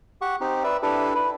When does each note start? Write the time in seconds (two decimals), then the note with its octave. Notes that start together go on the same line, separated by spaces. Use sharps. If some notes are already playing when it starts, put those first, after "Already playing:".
0.22 G4 F#5 C#6
0.41 C4 D#4 G4
0.64 B4 D5 E5
0.83 D4 E4 G4 A4 B4
1.15 E4 B4